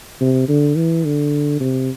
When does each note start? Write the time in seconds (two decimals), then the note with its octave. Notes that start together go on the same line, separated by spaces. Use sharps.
0.21 C3
0.48 D3
0.76 E3
1.05 D3
1.60 C3